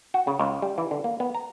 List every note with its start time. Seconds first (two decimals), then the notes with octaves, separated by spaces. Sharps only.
0.14 F#4
0.27 C#3
0.39 C#2
0.62 G3
0.78 E3
0.91 D3
1.04 A#3
1.20 B3
1.35 A#5